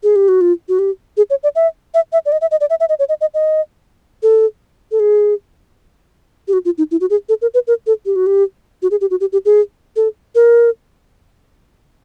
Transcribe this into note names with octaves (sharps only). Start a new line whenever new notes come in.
G#4
G4
F#4
F4
F#4
G4
G#4
C#5
D5
E5
E5
E5
D5
D#5
E5
D#5
D5
E5
E5
D#5
C#5
D#5
D#5
D#5
A4
A4
G#4
G4
F#4
F4
D#4
E4
F#4
G#4
A4
A#4
B4
A#4
A4
G4
F#4
G4
F#4
G#4
G4
F#4
G4
G4
G#4
A4
A#4